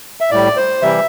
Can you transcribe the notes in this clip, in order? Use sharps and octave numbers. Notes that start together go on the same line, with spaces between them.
E5
A2 G3 D5
C5
C3 E3 G3 E5